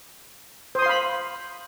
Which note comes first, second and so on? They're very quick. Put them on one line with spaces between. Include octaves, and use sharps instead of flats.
C5 D#6 C6 F5 B5